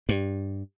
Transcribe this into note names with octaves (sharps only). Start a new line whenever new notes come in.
G2